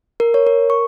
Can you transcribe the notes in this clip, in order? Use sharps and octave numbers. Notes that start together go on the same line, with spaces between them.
A#4
C#5
A#4
C#6